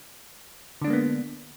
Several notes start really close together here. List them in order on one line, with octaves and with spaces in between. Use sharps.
D3 D4 G#3 A#3 B3